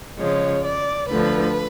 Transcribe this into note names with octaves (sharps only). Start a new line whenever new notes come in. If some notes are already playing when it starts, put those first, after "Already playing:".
C#3 F3 G#3 C#5
D5
D2 D3 F3 B4